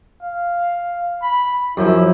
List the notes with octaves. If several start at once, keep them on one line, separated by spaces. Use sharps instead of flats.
F5
B5
F#2 F3 E4